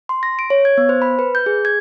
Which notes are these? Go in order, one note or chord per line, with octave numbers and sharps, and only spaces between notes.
C6
A#6
D7
C#5
G#6
B3
C5
B5
B4
G6
G#4
G#6